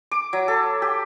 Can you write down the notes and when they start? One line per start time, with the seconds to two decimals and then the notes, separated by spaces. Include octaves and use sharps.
0.12 D6
0.33 F#3
0.48 A4
0.82 G4